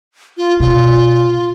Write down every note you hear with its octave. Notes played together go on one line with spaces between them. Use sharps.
F4
B2 F4